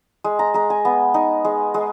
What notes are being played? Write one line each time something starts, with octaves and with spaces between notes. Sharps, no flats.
G#3
A#5
G#3 A#5
G#5
B3
D#4
G#3
G#3